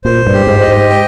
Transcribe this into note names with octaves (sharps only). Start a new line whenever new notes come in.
A#2 C5
G2
G4
G#2
D#5
G#2
G5